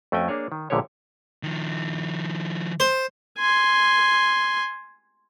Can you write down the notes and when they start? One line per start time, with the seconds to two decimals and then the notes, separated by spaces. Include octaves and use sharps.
0.12 F2 A3 C#4 F#4 G5 G#5
0.28 A#3 D4 G#4 C#5
0.52 D#3
0.70 A#1 A#2 D3 G#3 G4 C#5
1.43 D#3 F3
2.80 C5
3.39 G#5 C6